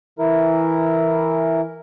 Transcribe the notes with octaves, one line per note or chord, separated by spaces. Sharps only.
E3 E4 A#4